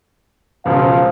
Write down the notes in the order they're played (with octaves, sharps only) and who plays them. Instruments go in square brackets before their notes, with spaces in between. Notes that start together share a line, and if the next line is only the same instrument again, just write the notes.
[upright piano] E1 C#2 [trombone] F3 [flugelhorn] F5